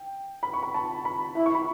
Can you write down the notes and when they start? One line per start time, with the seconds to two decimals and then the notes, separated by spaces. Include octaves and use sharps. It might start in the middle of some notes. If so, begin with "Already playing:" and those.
Already playing: G5
0.43 B5
0.53 C#6
0.63 B5
0.74 A5
1.05 B5
1.36 E4
1.46 C#6
1.55 B5